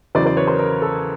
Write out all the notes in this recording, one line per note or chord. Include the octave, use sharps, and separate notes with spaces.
E2 C#3 F#3 C5 D5
C5 D5
B4 C#5
A#4 C5
A#4
A4